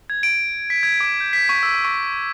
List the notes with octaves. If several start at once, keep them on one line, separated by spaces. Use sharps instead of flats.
G#6
D7
B6
G#6
D6
G6
B6
C#6
E6
C#6